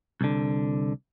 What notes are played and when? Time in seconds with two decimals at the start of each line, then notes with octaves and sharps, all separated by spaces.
0.21 C2 D3